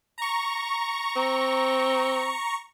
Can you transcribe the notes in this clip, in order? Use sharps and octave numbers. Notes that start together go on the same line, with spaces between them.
A#5 C#6
C4